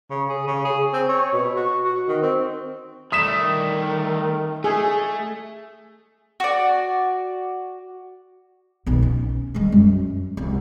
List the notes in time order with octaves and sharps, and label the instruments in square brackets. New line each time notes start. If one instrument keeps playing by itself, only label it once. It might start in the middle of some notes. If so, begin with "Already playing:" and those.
[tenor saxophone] C#3
G#4
C#3
G#4
C4
C#5
B2
F#4
F#4
D#3
C4
[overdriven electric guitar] G3 A3 [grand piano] D#6 B6 E7
[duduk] D#3
[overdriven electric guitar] A3 [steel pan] G#4
[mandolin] F#4 D5
[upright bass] B1 B2
C#4
G3 G#3
F#2
C2